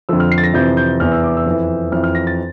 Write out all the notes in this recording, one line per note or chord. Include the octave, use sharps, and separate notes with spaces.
F2 D3 F3 E6
F6
C7
A6
A#6
F2 C3 E3 G6
G6
E2 E3 F6
E6
D6
E6
F2 E3
F2 E3 F6
F6
A#6
A6